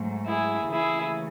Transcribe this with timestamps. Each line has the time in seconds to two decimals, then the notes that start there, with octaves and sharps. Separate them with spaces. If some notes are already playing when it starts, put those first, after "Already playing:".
Already playing: G#2 F#3 A3
0.28 E4 G#4
0.71 D#2 C#3 E3 A3 E4 G#4